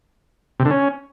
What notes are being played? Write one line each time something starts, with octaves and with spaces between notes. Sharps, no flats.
C3
D3
C#4